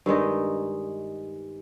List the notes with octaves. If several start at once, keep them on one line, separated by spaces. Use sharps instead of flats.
G2 D#3 G#3 D#4